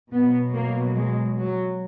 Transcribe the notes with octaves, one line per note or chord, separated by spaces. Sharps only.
B2 F#3 B3
A#3
G#3
F#3